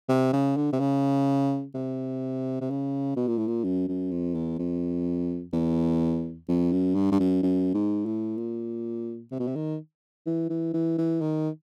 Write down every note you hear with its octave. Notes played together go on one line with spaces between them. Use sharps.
C3
C#3
D3
C3
C#3
C3
C3
C#3
B2
A#2
A2
A#2
F#2
F#2
F2
E2
F2
E2
F2
F#2
G2
G2
F#2
F#2
G#2
A2
A#2
C3
B2
C3
D#3
E3
E3
E3
E3
D#3